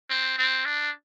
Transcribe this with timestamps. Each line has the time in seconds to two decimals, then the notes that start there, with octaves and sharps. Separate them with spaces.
0.10 C4
0.38 C4
0.65 D4